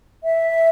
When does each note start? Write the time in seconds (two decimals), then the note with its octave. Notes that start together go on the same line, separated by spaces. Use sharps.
0.24 E5